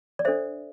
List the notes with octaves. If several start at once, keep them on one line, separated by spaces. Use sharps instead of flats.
D5
D4 A4 C5 E5